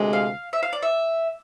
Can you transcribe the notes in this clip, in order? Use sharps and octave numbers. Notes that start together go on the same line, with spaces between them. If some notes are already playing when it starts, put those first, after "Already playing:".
Already playing: D2 C3 G#3
F5
E5
F5
D5
E5